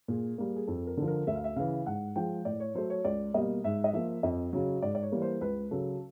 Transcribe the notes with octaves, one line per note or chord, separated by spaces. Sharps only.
A#2 G#4
G3 A#3
G#4
F2 A4
A#4
D3 F3
A#4
D2 E5
F5
E5
C#3 E3 F5
G#2 F#5
F3 G#3 G5
A2 D5
C#5
F#3 A3 C5
C#5
C#2 D5
B2 G3 A#3 D#5
G#2 E5
D#5
F3 A#3 E5
F2 D#5
C#3 F#3
G#2 D5
D5
C#5
E3 G3 A#3
C5
C#2 B4
C#3 F#3 A4